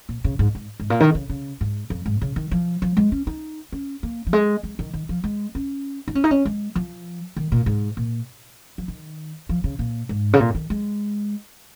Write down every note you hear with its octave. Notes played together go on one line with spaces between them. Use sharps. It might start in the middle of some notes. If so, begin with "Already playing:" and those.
A#2
C#3
G#2
G#2
G#2
A#2
D#3
C#3
C#3
G#2
F2
G#2
C#3
D#3
F3
F3
G#3
C#4
D#4
C#4
A#3
F3
G#3
G#3
D#3
D#3
F3
G#3
C#4
D#4
C#4
D#4
C#4
G#3
F3
D#3
A#2
G#2
A#2
F3
D#3
F3
C#3
A#2
G#2
C#3
A#2
D#3
G#3